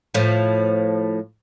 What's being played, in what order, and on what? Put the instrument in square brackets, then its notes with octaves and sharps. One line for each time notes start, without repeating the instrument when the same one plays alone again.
[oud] A2 F3